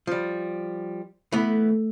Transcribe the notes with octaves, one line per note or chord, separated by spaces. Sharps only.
F3 G3
E3 A3 B3